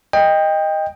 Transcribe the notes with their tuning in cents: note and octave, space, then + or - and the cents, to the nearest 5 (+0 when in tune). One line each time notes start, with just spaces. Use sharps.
D#5 +0 G5 +20